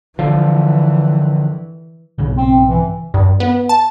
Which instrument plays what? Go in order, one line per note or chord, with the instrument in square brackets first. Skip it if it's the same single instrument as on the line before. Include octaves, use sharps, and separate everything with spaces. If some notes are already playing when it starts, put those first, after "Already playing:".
[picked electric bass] D3 F3 [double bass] E3
[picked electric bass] B1 G#2 C#3
[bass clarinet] C4
E3
[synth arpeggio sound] G2
B3
A5